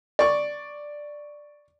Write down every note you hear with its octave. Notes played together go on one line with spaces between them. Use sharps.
D5 C#6